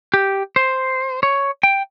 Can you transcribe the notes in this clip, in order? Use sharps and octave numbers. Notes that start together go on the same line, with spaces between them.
G4
C5
C#5
G5